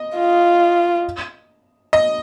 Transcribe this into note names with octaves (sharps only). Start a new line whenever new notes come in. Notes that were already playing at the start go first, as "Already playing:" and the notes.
Already playing: D#5
F4
D#5